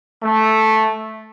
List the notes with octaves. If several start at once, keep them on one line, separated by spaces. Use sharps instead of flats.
A3